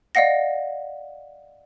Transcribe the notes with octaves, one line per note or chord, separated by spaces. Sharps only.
D5 D#5 F5 F#5 A#6